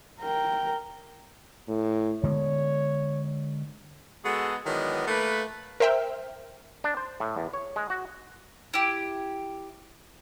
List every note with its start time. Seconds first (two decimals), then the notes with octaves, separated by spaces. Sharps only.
0.21 A#4 G5
1.68 A2
2.23 D3 G#3 B3 C#5
4.25 G#3 B3 F#4 G#4 A4
4.66 D#3 E3 F#3 G#3 B3 D4
5.07 A3 A#3 B4
5.80 A#4 C5 E5 G5 F6
6.84 D4
6.97 C5
7.20 A2
7.36 E2
7.53 C#5
7.76 G#3
7.90 F#4
8.74 E4 G4